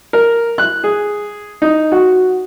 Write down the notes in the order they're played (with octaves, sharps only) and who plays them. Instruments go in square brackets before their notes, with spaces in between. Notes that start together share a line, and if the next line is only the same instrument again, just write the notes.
[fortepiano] A#4
F#6
G#4
D#4
F#4